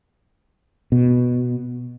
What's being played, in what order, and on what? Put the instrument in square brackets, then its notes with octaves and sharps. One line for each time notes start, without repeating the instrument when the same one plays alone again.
[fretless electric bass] B2